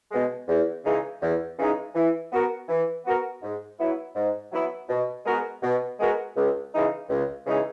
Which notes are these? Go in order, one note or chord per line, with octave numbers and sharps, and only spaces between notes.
B2 G#3
E2
C#3 E3 G#3 D#4
E2
C#3 E3 G#3 D#4
E3
B3 F#4 A#4
E3
B3 F#4 A#4
G#2
F#3 B3 E4
G#2
F#3 B3 E4
B2
G#3 B3 F#4 A#4
B2
G#3 B3 F#4 A#4
C#2
C#3 E3 G#3 D#4
C#2
C#3 E3 G#3 D#4